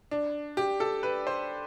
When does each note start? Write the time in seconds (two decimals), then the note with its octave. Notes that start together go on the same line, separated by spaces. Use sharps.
0.11 D4
0.57 G4
0.80 A4
1.03 B4
1.27 C5